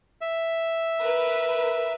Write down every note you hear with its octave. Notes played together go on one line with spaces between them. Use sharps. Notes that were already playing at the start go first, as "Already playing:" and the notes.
E5
A#4 B4